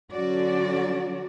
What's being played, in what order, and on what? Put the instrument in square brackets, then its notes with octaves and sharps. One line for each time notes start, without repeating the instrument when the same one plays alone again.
[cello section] D3 F#3 C#4 F#4 D5